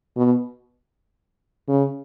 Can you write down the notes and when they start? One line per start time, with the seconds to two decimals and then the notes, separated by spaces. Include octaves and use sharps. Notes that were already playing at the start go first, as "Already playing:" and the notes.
0.16 B2
1.68 C#3